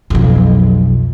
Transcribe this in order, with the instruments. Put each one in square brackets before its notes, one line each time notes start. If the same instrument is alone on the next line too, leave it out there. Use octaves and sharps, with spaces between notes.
[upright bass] B1 F2